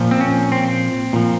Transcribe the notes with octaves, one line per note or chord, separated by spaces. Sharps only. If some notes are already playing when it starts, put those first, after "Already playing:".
Already playing: A#2 F3
C4
C#4
C4
A#2 F3